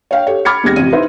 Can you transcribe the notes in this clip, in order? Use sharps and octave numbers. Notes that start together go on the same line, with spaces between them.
C#5 F5 G5
G4 A4 C#5
B5 D6 F6 G#6 A6 C#7
E2 G#3 C4 G4 G#6 A#6
A1 F2 C3 D#7
D#4 E4 B4 C5 D#5 E5